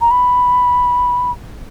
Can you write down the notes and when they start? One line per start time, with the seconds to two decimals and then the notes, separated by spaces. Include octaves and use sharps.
0.01 A#5
0.11 B5